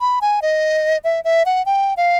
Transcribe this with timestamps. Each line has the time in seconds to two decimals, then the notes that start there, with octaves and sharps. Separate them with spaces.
0.01 B5
0.21 G#5
0.42 D#5
1.04 E5
1.24 E5
1.46 F#5
1.66 G5
1.97 F5